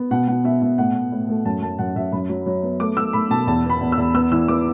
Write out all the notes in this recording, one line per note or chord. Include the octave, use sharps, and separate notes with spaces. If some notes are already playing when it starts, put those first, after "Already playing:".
Already playing: B3
B2 F#5
B2 F#5
B2 E5
B2 E5
A2 F#5
A2
A2
A3
F#2 A5
F#2 A5
F#2 F#5
F#2 E5
F#2 B5
F#3
F#3
B3
A3 D6
A3 E6
A3 B5
B2 A5
E2 A5
B3
B5
E2
E6
E2
B3 E6
E3 E6
B3 D6